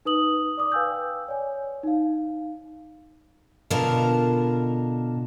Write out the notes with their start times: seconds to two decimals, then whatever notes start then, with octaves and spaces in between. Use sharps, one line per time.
0.05 D#4 B4 D#6 F#7
0.57 D5 D6 D#6
0.72 B4 F5 G5 G#5 E6 G6
1.28 C#5 D5 G#5
1.83 D#4 F5
3.70 B2 D3 F4 A#4 A5